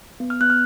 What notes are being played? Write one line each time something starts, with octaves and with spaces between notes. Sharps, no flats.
B3
F6
B3 F#6
F6